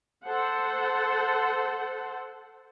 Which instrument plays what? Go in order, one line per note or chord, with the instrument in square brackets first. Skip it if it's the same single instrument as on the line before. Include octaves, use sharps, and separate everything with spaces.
[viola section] A4 C5 F#5